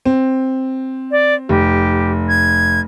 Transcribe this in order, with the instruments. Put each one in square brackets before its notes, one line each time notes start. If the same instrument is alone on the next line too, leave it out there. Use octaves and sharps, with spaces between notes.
[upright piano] C4
[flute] D5
[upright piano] F1 [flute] G4
[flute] G#6